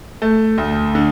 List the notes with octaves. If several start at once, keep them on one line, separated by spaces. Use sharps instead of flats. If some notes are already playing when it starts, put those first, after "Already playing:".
A3
D2
D3